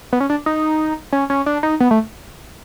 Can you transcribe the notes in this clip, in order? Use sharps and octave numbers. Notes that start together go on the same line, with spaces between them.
B3
C#4
D4
D#4
C#4
C#4
D4
D#4
B3
A3